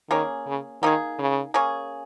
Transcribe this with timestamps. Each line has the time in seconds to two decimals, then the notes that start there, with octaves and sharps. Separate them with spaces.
0.10 D#3 A#3 C#4 G#4
0.46 C#3
0.83 D#3 A#3 D#4 G#4
1.19 C#3
1.54 A#3 C#4 G#4